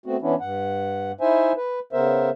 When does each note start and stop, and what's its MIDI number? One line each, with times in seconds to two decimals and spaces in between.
0.06 0.17 57
0.06 0.17 59
0.06 0.17 60
0.06 0.17 66
0.22 0.35 52
0.22 0.35 59
0.22 0.35 61
0.22 0.35 62
0.22 0.35 64
0.40 1.12 43
0.40 1.12 78
1.21 1.52 63
1.21 1.52 64
1.21 1.52 72
1.21 1.52 76
1.21 1.52 80
1.57 1.80 71
1.93 2.30 49
1.93 2.30 59
1.93 2.30 70
1.93 2.30 72
1.93 2.30 76